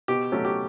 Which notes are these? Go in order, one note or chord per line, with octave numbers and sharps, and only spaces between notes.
B2 G4
F#3 A3 C#4
G4